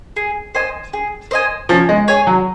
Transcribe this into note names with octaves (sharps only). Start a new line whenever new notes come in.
G#4
C5 D#5 G#5
G#4
C5 D#5 G#5
F3 C#4
G#3
G#4 C#5 G#5
F#3